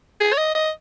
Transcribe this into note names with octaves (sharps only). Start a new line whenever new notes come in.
G#4
C#5
D#5
D#5